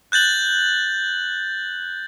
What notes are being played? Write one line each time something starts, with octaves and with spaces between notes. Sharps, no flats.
F#6 G6 A6 F#7